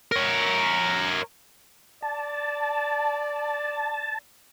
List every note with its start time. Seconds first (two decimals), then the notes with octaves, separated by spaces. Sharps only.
0.12 A#4 C#5
2.02 D5 A5